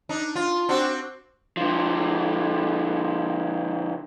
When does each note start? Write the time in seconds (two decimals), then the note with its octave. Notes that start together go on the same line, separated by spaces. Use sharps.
0.09 D4 D#4
0.36 F4
0.69 C4 D4 F#4
1.57 D3 F3